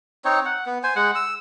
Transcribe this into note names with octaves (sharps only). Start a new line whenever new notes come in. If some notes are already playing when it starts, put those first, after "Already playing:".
C4 D#4 C#5
F#5
B3
C5 G#5
G#3 F#5
E6